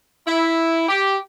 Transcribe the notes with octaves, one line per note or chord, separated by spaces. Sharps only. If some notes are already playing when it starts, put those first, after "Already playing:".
E4
G4